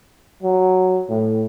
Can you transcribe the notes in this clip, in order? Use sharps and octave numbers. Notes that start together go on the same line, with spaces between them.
F#3
A2